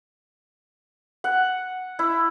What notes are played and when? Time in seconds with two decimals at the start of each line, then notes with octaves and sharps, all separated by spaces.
1.24 F#5
1.99 E4